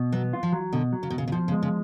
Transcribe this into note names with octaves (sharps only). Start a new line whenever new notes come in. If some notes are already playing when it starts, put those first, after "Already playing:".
Already playing: B2
F#3 B3
F4
F3
F#3
B2 D3
F#3
C#3
B2
B1 C#3
C#3
B2 F3
C#3
G#3
C#3